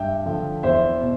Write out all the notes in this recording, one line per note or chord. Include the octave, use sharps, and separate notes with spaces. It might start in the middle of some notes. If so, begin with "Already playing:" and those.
Already playing: G2 E5 G5
D3 F3
E2 C5 E5
B2